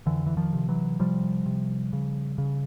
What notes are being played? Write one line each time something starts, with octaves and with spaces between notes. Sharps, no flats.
F2 D3 E3
E3
D#3 F3
C3
E3 F#3
C3 F3 G3
C3
C#3
C#3